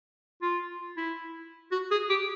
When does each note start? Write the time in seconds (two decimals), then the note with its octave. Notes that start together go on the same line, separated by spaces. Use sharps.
0.42 F4
0.97 E4
1.72 F#4
1.91 G#4
2.10 G4